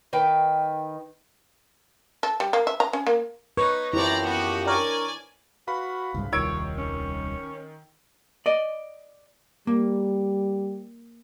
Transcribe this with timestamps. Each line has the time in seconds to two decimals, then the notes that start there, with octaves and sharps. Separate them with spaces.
0.13 D#3 B4 G5
2.23 A4
2.40 G3
2.53 A#3
2.67 E5
2.80 A#5
2.93 C#4
3.07 A#3
3.57 D#4 B4 C#5
3.93 F#2 F3 E4 G4 C5 D5 A#5
4.24 B3 F#4
4.66 D4 A#4 C#5 D5 G#5
5.67 F#4 B4 F5 B5
6.14 C2 G#2 C#3
6.32 D#1 C2 D#3 F3 C#5 E6 G#6 D7
6.78 C#4
8.46 D5 D#5
9.67 G3 A#3